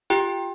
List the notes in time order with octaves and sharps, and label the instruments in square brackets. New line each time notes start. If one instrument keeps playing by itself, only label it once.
[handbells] F4 G4 G5